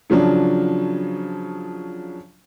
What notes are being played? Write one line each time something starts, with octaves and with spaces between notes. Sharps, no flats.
C#3 F3 F#3 D4